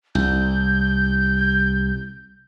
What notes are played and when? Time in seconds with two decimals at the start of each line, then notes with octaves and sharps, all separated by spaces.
0.15 C2 G6